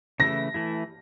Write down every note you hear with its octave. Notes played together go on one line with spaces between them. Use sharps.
C#3 E3 A3 E4 A#6
E3 A3 E4